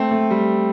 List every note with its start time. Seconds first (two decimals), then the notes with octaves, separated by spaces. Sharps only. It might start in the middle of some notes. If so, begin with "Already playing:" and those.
Already playing: A3 C4
0.11 A3
0.30 G3